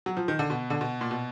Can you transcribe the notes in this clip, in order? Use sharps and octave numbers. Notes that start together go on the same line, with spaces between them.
F#3
F3
D#3
D3
B2
D3
B2
A#2
B2